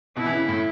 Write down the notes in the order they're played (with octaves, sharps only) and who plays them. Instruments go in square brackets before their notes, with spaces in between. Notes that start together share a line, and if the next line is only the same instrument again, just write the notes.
[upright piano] B2 [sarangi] E4
[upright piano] E3
C#3
A2